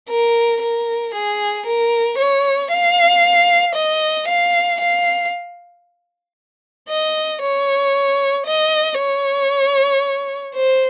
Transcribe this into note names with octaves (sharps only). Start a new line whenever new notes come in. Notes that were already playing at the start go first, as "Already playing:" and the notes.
A#4
A#4
G#4
A#4
C#5
F5
D#5
F5
F5
D#5
C#5
D#5
C#5
C5